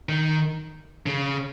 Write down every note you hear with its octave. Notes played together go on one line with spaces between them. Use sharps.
D#3
C#3